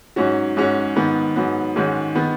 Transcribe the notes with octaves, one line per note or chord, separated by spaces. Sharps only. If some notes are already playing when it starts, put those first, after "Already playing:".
G#2 F#3 C#4 F#4
G#2 G#3 C#4 F#4
G#2 D#3 B3
G#2 F#3 B3
G#2 D#3 G#3 C#4 F#4
D#3 B3